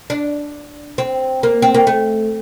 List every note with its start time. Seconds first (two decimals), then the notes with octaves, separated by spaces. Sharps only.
0.10 D4
0.98 C4
1.43 A#3
1.62 C4
1.74 A#3
1.87 A3